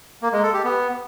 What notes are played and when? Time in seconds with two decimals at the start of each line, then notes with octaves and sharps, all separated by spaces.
0.22 A#3
0.33 G#3
0.43 A4
0.53 G4
0.64 B3